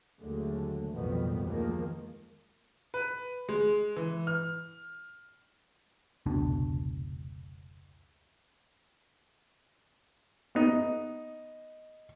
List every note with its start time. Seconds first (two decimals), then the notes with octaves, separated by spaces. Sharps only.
0.21 D#2 D3 F#3 G#3 A3
0.91 B1 F2 A2 D#3 G3 B3
1.44 D2 D#3 F3 G#3 A#3
2.94 B4
3.49 G#3
3.96 E3
4.27 F6
6.26 F1 C#2 B2 D4
10.55 B3 D#4